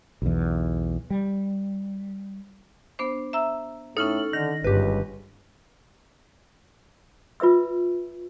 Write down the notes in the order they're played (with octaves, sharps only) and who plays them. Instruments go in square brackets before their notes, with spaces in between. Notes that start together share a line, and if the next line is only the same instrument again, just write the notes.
[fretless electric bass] B1 E2
G3
[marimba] B3 D4 C5
E5 A#5 E6
[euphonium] A2 [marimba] C#4 D#4 [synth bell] A4 F6 F#7
[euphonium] D3 [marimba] D#3 [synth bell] A#6
[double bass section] G1 G2 [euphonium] C#2 [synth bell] G4 B4
[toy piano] F4 B4 E5 E6